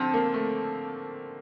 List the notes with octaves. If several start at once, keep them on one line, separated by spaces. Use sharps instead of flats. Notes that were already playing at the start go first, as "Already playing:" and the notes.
Already playing: D3 F3 C4
A#3
A3